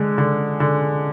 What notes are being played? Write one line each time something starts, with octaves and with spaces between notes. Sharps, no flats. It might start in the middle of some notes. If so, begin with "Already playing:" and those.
Already playing: D3 G#3
D3
D3